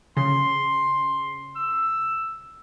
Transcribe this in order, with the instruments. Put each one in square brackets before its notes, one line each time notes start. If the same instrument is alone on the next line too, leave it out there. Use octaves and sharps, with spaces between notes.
[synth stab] C#3 [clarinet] C6
[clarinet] E6